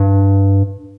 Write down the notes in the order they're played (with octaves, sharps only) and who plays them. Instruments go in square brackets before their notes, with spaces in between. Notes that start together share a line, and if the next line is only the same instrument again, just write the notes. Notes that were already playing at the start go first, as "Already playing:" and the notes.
Already playing: [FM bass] G2